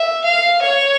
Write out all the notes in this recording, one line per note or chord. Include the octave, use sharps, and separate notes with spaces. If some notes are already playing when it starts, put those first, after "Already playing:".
Already playing: E5
F5
C#5